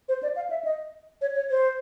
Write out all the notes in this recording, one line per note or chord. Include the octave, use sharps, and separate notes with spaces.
C5
D5
F5
E5
D#5
C#5
C#5
C5